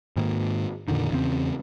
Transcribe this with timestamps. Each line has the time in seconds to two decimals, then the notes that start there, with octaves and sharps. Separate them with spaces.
0.16 G#2 D#3 A#3
0.88 F2 A#2 D3 D#3
1.10 E2 C#3 C4